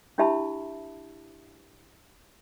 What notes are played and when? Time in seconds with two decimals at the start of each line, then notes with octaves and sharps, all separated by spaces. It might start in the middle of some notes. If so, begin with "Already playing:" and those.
0.18 D4 E4 G4 E5 A5 B5